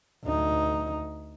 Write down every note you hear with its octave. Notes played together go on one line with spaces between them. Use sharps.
D2 D#4